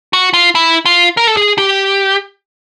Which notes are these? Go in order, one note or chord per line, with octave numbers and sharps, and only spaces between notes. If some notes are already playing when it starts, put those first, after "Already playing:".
F#4
F4
E4
F4
A#4
A4
G#4
G4